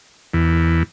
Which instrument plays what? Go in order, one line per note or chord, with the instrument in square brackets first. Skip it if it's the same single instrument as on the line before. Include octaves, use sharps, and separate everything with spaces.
[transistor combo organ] E2